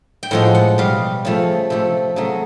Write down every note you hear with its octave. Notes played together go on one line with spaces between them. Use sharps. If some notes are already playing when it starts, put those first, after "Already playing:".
G5
A2 F3 G#3 F#5
F#5
B2 G3 F5
C#3 F3 A3
C3 F3 A3
C#3 F#3 A3